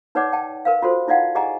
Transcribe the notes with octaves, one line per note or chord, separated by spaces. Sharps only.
D#4 B4 C#5 D5 F#5 D6
F#5 G5 A5
A#4 B4 F5
F4 F#4 A4 C5
D#4 E4 D5 F5 F#5
G4 G#4 D#5 F#5 G#5 A#5